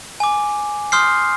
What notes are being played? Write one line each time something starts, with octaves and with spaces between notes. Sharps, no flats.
G#5 D6
C6 D#6 F6 G6 C7